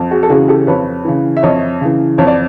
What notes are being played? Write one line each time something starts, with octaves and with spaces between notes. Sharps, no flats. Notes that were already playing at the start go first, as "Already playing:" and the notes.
Already playing: F2
F#4 G#4
A4
C#3 E3 F#4 G#4
G4 A4
F2 B4 C#5
C#3 E3
E5
F2 C#5 D#5
C#3 E3
F2 C#5
D5